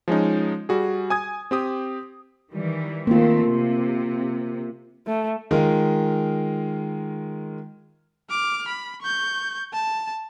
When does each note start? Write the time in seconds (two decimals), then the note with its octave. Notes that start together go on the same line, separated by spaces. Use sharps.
0.08 F3 G#3 C#4 D#4
0.69 G3 F#4 G#4
1.10 G#5 D#6 G#6
1.51 C4 G4 D#6
2.52 D#3 E3 G3
3.07 D#3 A3 A#3 C4 F4
3.45 C3
5.07 A3
5.51 D#3 G#3 F4 A#4
8.31 D6 F6
8.68 B5
9.02 C#6 G6
9.73 A5